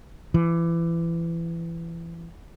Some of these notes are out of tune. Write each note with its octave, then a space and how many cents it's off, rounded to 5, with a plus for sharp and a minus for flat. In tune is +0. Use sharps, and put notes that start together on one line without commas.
E3 +25